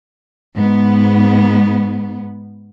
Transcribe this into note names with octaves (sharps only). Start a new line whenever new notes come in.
G#2 B3